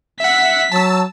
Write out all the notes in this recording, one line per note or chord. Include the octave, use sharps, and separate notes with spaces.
E5 F#5 B6
F#3 A5 E6